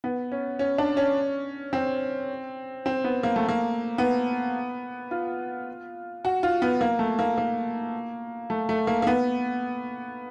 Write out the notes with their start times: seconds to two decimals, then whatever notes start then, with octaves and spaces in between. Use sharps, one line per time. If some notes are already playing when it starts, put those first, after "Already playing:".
0.04 B3
0.32 C#4
0.59 C#4
0.78 D4
0.97 C#4
1.73 C4
2.86 C4
3.04 B3
3.23 A#3
3.36 A3
3.49 A#3
3.98 B3
5.11 F4
6.25 F#4
6.43 F4
6.62 B3
6.81 A#3
6.99 A3
7.19 A#3
7.38 A#3
8.50 A3
8.69 A3
8.87 A#3
9.02 A#3
9.07 B3